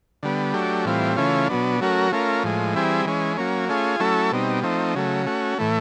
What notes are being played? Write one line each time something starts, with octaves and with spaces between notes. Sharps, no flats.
D3 G3 B3
F#3 A3 D4 G4
A2 E3 G3 C4 F4
C#3 E3 A3 C#4 F4
B2 F#3 B3 D4
F#3 A3 C#4 F#4 A#4
A3 C#4 F4 A#4
A2 F3 G#3
E3 G3 C4 E4 G#4
E3 G#3 C#4
F#3 A#3 C#4
A3 C#4 F4 G#4
F#3 A3 C#4 E4 A4
B2 G3 C4 D#4
F3 A3 C4 D#4
C#3 F#3 A3
A3 C#4 F#4
A2 E3 A3